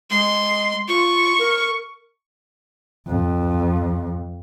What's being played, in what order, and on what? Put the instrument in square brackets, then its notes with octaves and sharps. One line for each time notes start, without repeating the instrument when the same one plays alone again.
[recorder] G#3 [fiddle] C6
[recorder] F4 [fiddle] C#6
[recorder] A#4
[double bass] F2